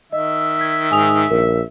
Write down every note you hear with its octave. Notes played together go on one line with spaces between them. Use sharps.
D#3 D#5 E5
G#6 B6
G#2 G#5 D#6 F7
A#1 A#4